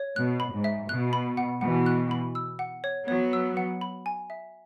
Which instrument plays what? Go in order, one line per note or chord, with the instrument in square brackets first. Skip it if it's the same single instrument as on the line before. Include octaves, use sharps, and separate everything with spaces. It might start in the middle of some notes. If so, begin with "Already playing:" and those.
Already playing: [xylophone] C#5
[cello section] B2 [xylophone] F#6
[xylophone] B5
[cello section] G#2
[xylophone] E5
[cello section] B2 [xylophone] F#6
[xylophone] B5
F#5
[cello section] B2 E3 [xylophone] F#5
[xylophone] F#6
B5
E6
F#5
C#5
[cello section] F#3 B3 [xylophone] C#5
[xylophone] E6
F#5
B5
G#5
E5